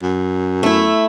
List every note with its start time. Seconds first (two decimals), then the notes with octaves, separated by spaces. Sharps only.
0.03 F#2
0.63 A3 E4